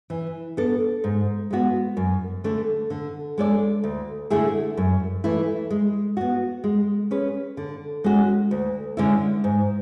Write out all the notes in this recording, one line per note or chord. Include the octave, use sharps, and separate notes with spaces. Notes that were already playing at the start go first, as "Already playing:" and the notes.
E3
B3 D4 A4
G#2
G#3 B3 F#4
F#2
D3 A3 D4
D3
G#3 D4 A4 D5
D2
D3 A3 E4 G#4
F#2
E3 A3 E4
G#3
B3 F#4
G#3
C#4 G#4 B4
D3
G#3 C#4 F#4
D2
D3 G#3 C#4 E4
G#2